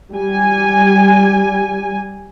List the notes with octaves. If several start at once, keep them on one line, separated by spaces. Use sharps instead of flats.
G3 G#5